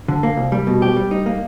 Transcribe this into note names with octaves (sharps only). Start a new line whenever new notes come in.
D3
A#3
C2
G3
B2
G4
G3
D#4
A#3